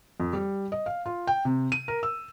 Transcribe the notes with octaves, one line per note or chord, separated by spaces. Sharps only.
F2
G3
D#5
F5
F4
G5
C3
D#7
A#4
E6